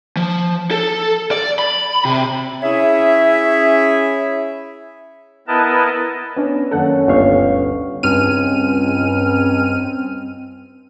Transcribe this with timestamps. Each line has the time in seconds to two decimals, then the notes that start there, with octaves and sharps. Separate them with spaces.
0.17 F3
0.71 A4
1.31 D5
1.59 B5
2.05 C3
2.63 C#4 E4 G#4 C#5 E5
5.48 B3 E4 A#4 B4 D#5 A5
6.36 B3 C#4 D4
6.71 F#2 D#3 A#3 C#4 A4 F#5
7.08 G1 D2 F5 C#6
8.03 C#2 G2 C4 C#4 F6 D#7